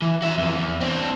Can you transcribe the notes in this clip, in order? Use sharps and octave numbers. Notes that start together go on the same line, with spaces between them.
E3
F#4 E5
F2 E3
E2
C4 D4